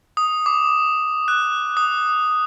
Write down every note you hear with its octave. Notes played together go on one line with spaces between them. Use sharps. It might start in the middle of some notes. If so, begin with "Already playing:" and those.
D#6
D6
F#6
D#6